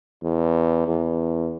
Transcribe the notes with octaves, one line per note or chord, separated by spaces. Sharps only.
E2
E2